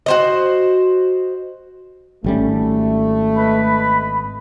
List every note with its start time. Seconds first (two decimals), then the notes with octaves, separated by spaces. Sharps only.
0.06 F#4 C5 D#5
2.24 G#1 G3 A3 C#4
3.37 B4 D#5 B5